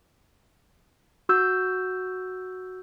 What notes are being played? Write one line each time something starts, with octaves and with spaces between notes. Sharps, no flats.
F#4 E6 G6